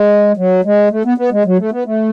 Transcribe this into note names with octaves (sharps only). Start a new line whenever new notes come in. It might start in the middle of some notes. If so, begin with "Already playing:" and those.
Already playing: G#3
F#3
G#3
A3
B3
B3
G#3
F#3
A3
B3
A3